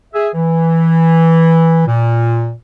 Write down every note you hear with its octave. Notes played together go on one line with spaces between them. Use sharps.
G#4 E5
E3
A#2